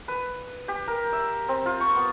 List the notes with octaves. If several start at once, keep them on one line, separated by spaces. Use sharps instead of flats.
B4
G4
A#4
E5
C4
F4
C#6
B3